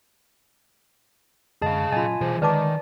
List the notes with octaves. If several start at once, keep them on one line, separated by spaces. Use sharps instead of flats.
F#2 D3 G#3 G#4 D#5 F5 A5
A#2 F#3 C#4 F4 D#5 G#5 B5
B2 E3 G#4 C5
D3 D#3 G#3 B4 D5 A5 D6